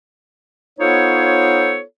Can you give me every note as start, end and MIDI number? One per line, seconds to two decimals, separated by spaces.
0.79 1.81 59
0.79 1.81 63
0.79 1.81 65
0.79 1.81 69
0.79 1.81 72
0.79 1.81 73